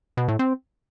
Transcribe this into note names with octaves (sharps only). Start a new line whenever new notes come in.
B2
A2
C4